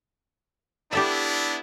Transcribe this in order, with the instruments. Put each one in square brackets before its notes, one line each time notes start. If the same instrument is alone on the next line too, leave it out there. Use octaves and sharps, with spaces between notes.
[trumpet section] B3 D4 E4 [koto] G4 A4 E5